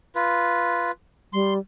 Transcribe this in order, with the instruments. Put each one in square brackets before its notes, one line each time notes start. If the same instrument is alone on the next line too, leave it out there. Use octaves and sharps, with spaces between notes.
[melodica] F4 B4
[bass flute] G3 [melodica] C6